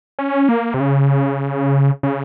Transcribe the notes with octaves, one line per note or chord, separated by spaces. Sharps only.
C#4
A#3
C3
C#3
C#3